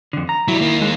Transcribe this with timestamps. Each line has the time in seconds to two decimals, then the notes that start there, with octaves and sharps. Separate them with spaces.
0.13 F2 D3
0.29 A#5
0.48 F#3 G3 E4
0.61 D#3 A#3
0.81 G#3